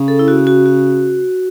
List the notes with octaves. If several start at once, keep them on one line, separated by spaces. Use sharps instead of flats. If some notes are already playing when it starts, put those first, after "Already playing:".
Already playing: C#3
A4
E4
F#4
F#4
F#4